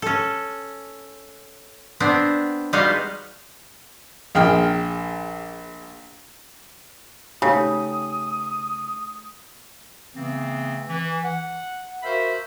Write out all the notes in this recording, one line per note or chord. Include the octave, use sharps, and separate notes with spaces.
C#4 A4
B3 C4 D4
G3 G#3 B3 D#4 F#4 F5
A#1 G#4 G5 F6
C#3 A3 D#4 G4 D#6
C#3 E3 A3 B3 C4
E3
F#5
F#4 A#4 C5 E5 F5 B5